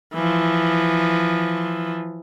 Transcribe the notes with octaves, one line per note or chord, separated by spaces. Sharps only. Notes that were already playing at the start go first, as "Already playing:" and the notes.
E3 F3